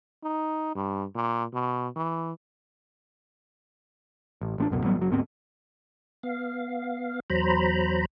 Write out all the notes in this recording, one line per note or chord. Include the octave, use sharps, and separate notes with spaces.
D#4
G2
A#2
B2
E3
A1
A1 B3 D4
C#2 F#2 B2
A1 F#3 G3 B3
F#1 F#3
D2 G#2 B3 C4
B3 F5
E2 F#3 C5 A#5 B5